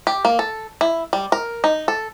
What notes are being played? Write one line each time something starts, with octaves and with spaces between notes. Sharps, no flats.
G4
A#3
A4
E4
G3
A#4
D#4
A4